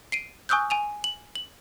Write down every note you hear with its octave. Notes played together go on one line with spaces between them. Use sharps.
C7 D7 D#7
G#5 C#6 D#6 E6 F#6 G6
G#5 D#7 F7
F#7
F#7